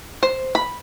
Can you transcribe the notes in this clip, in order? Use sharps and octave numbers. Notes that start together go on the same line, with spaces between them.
C5
B5